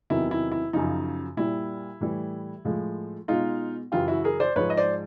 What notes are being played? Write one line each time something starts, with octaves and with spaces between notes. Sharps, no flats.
E2 C3 D#3 F#3 E4
E4
E4
F#2 C#3 F3 D#4
A#2 G3 E4
A2 E3 G3
A2 F3 G#3
B2 G#3 D#4 F4
F#2 C#3 E3 F4 G4
E4 F#4
G#4 A#4
C5 D5
G#2 F3 G#3 B4 C#5
D#5
C5 D5